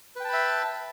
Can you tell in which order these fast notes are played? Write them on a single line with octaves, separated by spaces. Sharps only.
B4 G5 A5 B5 E5